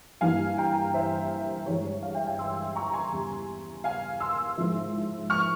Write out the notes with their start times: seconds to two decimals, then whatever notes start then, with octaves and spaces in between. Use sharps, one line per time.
0.21 G2 E3 A#3 F5 G#5
0.58 G5 A#5
0.94 C5 E5
1.66 G2 E3 G#3 C#5
1.85 C#5
2.03 C#5 F5
2.15 E5 G5
2.27 F5 G#5
2.39 C6 E6
2.75 A#5 C#6
2.93 G#5 C6
3.12 E2 C#3 G3
3.84 F5 G#5
4.20 C6 E6
4.57 G#2 F3 C4 E4
5.30 C#6 F6